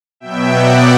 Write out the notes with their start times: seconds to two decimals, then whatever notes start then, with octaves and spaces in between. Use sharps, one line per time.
0.20 B2 F#3 B3 E5 G5
0.49 D5 F#5